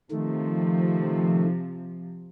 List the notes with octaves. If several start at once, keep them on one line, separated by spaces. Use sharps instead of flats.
C3 D#3 F3 A3